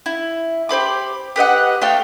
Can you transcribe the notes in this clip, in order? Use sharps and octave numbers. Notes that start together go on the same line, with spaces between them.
E4
G4 C5 B5 D6
G4 B4 D#5 F#5
A3 F4 F5 G5